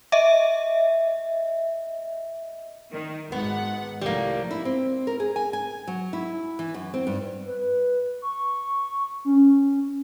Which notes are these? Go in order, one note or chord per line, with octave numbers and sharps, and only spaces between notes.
D#5 E5
D#3
G#1 B3 F#5
C2 F2 A2 G3 A#3
E4
C4
A#4
G#4
G#5
G#5
F#3
E4
E3
F#2
C4
G2
B4
C#6
C#4